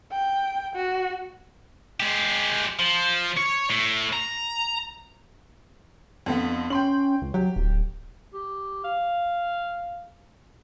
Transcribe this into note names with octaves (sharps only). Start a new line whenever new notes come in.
G5
F#4
G#3 G4
F3
C#5
A2
A#5
F2 D3 B3
C#4 G5 C6 F#7
C#2
F#3 G4
D1
G4
F5